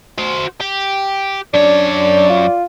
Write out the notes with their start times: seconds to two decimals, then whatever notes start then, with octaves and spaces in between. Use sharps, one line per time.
0.18 F#4 C5
0.61 G4
1.54 F#2 D4 C#5 D5
2.30 F4